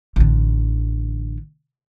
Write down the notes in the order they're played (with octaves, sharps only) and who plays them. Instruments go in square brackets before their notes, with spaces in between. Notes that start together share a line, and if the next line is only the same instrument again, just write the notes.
[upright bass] A1 D3